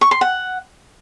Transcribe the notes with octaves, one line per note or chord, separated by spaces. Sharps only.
C#6
C6
F#5